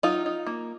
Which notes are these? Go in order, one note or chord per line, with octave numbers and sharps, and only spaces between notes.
F#3 D#4 F4
D#4
A#3